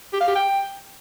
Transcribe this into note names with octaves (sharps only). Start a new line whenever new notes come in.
G4
F5
G4
G5